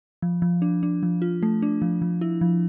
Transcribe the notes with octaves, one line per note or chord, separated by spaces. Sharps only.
F3
F3
D4
D4
F3
F4
A3
D4
F3
F3
E4
F3